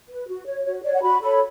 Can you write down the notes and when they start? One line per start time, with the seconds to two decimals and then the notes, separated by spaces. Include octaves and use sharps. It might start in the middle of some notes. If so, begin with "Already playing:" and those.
0.09 B4
0.28 F#4
0.46 C#5
0.65 F#4 C#5
0.84 C#5 D5
0.93 F#5
1.03 F#4 B5
1.22 A4 C#5 B5